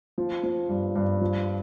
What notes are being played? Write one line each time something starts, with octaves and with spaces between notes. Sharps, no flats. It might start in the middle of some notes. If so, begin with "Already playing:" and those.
F3
F3
G2
G2
F3